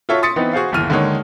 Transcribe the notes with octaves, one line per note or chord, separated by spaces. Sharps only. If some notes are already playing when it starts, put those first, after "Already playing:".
F4 F#4 A4 C#5 E5
C6 D#6 A6 B6 C#7
E3 B3 C4 D#4
F#4 G#4 C5 F5
G1 D#2 E3 F6 D#7
D3 D#3 G#3 A#3 D#4 C#5